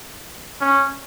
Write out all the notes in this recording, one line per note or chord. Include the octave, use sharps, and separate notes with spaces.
C#4